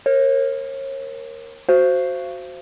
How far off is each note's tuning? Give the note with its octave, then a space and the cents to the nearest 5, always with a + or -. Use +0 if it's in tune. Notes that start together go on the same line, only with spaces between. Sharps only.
A#4 +0 C#5 -35
F#4 +0 C5 +0 F5 -35